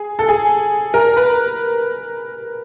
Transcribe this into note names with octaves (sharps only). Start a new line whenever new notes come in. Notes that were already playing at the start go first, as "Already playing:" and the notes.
Already playing: G#4
A4
G#4
A#4
B4